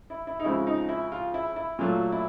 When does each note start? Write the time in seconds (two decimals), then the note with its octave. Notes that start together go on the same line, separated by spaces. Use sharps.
0.10 E4
0.27 E4
0.40 D#4
0.44 C#3 F3 G#3 C4 E4
0.67 D#4
0.89 E4
1.12 F4
1.34 E4
1.56 E4
1.79 A#2 F#3 A3 F4
2.12 E4